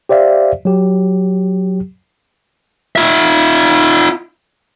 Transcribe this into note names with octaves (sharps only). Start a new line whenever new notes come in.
G4 C5 D5 E5 F5
F#3 G4
F4 E5